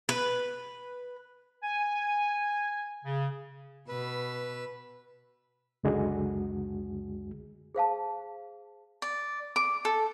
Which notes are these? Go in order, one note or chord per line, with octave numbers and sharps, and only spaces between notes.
B4
G#5
C#3
B2 B4 E6
C#2 F#2 D3 G#3 F#4 G#4
G#4 C5 F5 A5
D5
D6
A4